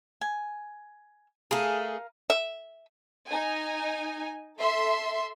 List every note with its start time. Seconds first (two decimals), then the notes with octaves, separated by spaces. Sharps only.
0.21 G#5
1.51 A3 G#4 A#4 F5
2.30 E5
3.29 D#4 G#5
4.59 A4 E5 C6